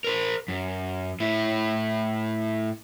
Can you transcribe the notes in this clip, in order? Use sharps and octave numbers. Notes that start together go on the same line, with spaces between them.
A#4 C5
F#2
A2 E4